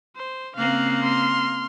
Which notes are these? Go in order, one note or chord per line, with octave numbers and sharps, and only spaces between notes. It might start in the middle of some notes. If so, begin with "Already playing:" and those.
C5
C#3 A#3 C4 F5 F#6
C6 F6